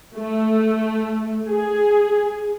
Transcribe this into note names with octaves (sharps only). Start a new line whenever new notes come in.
A3
G#4